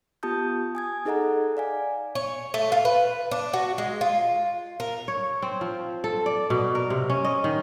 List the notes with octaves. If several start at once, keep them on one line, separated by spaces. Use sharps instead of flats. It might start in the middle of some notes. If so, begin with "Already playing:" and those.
B3 F4 G4 A5 D#6 G6
G#5 D#6 G#6
D#4 G#4 A4 D#5 F#5 A#5
D5 F5 G#5
C#5
A3
F4
B4
D4
F#4
G#3
F4
A#4
C#5
C4
F3
A4
D5
B2
A#4
C3
C#4
D#5
D#3